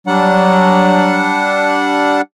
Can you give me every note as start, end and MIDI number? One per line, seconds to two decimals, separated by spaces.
0.07 1.42 54
0.07 2.21 55
0.07 2.21 62
0.07 2.21 78